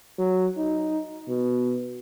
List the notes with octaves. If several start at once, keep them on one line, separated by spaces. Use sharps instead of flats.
F#3
D#4
B2